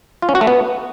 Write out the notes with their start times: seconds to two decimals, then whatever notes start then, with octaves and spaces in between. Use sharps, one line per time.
0.22 F4
0.29 C#4
0.35 F#4
0.41 A3
0.47 B3